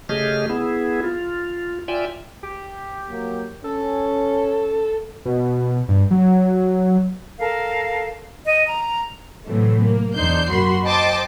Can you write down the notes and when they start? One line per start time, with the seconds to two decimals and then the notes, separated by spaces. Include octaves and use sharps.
0.09 C#3 A3 G4 G#4 D#5 F6
0.49 B3 E4 G#4
1.04 F4
1.88 F4 D5 E5 G5 G#5
2.43 G4
3.09 F#3 A#3
3.64 C#4 A4
5.25 B2
5.88 G2
6.11 F#3
7.39 A4 A#4 F5
8.46 D#5
8.67 A#5
9.46 A2 C3 E3 F#3 A3
9.82 A#3
10.14 E2 D4 D#4 C5 G6 C7
10.50 F#2 A#3 F#4 B5 C6
10.84 C5 D#5 G5 A5 C6 D6